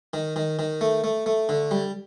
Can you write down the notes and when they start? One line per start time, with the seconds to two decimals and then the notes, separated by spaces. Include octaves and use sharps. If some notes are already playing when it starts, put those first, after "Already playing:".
0.13 D#3
0.36 D#3
0.59 D#3
0.81 A3
1.04 A3
1.26 A3
1.49 D3
1.71 G3